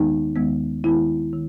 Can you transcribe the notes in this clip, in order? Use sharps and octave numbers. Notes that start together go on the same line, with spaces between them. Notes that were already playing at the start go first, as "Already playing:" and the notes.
Already playing: D#2 D#3 G#3 B3 D#4
D#2 D#3 G#3 B3
D#2 D#3 G#3 B3 E4
D#3